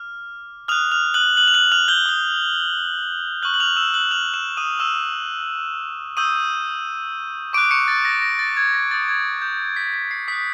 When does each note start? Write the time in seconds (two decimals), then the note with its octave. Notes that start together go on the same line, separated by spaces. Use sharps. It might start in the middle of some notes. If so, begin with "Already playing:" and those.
Already playing: D6 F6
0.68 D#6 F6 F#6 F7
0.92 F6 F7
1.14 F#6 F#7
1.37 F#6 F#7
1.48 F7
1.54 F#6 F#7
1.72 F6 F7
1.88 G6 G7
2.06 D#6 G6
3.42 C#6 F6 F#6 F#7
3.54 F#7
3.60 F6 F7
3.76 E6 E7
3.94 F#6 F#7
4.11 F6 F7
4.34 E6 E7
4.57 D#6 D#7
4.79 C#6 E6 F6 E7
6.17 C#6 D#6 E6 G6 D#7
7.53 C#6 D6 F#6 D7
7.71 C#6 C#7
7.88 A6
8.05 A#6
8.22 A#6
8.39 A6
8.57 G#6
8.74 A#6
8.91 D#6 G6 A6
9.08 G#6
9.42 G6
9.76 B6
9.94 B6
10.11 C7
10.28 D#6 F#6 B6